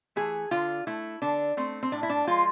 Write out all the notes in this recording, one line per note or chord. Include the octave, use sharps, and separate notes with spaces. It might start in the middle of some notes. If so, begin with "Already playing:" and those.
E3 A3 G#4
D3 F4
A3 E4
D3 D4
A3 C4
C4
A2 D4
E4
D4
F3 G#3 F4